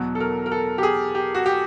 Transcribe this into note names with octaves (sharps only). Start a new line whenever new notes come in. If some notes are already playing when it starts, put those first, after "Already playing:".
Already playing: E2 B2 F#3
A4
A#4
A#4
A4
G4
G#4
G4
F#4
G4